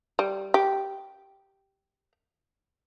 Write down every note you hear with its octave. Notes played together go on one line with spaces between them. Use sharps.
G3
G4